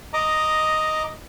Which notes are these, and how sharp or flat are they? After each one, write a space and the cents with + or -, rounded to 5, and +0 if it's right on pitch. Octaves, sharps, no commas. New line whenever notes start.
D#5 +0 A#5 +0 D6 +0